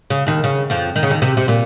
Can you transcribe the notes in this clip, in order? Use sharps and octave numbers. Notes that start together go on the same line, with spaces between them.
C#3
D#2 D#3
C#3
F2 F3
D#3
C#3
D#2 D#3
C3
C3
A#2